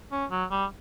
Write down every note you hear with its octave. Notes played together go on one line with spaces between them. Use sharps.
C#4
F#3
G3